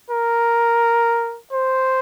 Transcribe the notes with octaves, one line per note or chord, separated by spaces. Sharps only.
A#4
C5